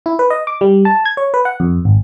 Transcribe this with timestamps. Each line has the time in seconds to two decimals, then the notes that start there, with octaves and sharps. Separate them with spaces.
0.06 E4
0.19 B4
0.30 D#5
0.47 D6
0.61 G3
0.85 A5
1.05 G#6
1.17 C#5
1.34 B4
1.45 F#5
1.60 F2
1.85 G#1